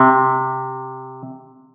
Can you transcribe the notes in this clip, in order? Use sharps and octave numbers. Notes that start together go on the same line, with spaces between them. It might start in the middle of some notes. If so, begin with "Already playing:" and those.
Already playing: C3